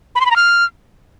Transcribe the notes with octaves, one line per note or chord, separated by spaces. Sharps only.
B5
C6
B5
A#5
F6